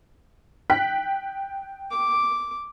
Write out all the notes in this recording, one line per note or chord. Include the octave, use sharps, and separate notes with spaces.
G5 F#6 B6
D6